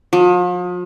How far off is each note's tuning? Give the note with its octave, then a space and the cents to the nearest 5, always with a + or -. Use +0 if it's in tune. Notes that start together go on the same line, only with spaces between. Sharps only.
F3 +40